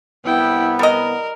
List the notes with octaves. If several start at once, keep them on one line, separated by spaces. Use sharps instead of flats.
C2 B3 E4 G5
G3 A#4 D#5